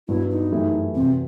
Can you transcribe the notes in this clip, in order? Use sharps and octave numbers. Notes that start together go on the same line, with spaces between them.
G2 F#3 B3 E4 F#4
D#4
F#2 E3 A3 E4 G4
E2 C3 F#3 C4